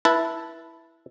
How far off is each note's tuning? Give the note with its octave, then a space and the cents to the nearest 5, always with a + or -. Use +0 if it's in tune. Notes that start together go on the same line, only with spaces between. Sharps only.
E4 +0 B4 -20 A5 +0